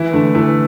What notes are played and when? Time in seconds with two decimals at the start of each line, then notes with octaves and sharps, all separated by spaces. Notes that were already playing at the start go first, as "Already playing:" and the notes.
Already playing: E3 E4
0.13 D3 A3
0.35 E3 A3